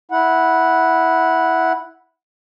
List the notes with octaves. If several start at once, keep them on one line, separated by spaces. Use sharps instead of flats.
E4 F#5